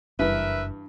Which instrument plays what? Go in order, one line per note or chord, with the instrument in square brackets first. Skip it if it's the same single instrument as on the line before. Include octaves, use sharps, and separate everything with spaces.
[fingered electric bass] F#1 [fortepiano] G2 E3 [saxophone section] A#4 B4 E5